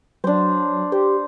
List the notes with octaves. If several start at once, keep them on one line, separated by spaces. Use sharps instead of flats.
F#3 D4 C5
G4 C5